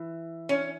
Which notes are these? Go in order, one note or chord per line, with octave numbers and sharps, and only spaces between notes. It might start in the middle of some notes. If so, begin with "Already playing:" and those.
Already playing: E3
C#4